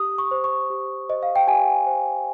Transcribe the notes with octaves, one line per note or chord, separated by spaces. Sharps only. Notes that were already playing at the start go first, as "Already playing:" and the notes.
Already playing: G4 D#6
C#6
C5
C#6
G4
C5 D#5
F5
G5
G4 G#5
C5